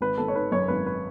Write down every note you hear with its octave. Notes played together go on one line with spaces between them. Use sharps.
G#1 B4
G#1 A4
C#5
D#3 B4
F#2 C#5
G#1 B4
B4